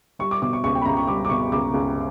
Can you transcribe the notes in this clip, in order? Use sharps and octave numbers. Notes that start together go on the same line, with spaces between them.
G3 C#6
D6
B2 D6
C#6
C#2 C#6
G5
B5
C#2 A#5
C#6
G3 D6
D6
B2 C#6
C#2 D6
C#2